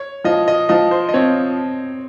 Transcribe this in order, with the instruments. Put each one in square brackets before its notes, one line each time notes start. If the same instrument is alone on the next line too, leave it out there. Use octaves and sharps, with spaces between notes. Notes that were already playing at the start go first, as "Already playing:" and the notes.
Already playing: [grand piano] C#5
[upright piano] F3 [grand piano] D#5
[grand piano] D#5
[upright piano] F3 [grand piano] D#5
[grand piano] C5
D#5
[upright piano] C4 [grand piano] C#5